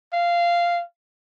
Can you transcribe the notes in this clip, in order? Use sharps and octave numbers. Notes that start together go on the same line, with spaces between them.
F5